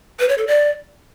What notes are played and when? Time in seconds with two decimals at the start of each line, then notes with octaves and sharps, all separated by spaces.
0.20 B4
0.29 C#5
0.38 A4
0.47 D5